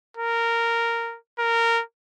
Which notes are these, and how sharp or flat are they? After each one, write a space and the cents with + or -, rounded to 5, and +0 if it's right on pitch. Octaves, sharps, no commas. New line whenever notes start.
A#4 -10
A#4 -15